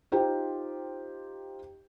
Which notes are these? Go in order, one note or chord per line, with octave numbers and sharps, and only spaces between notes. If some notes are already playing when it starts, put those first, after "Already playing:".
D#4 F4 G4 C5 G5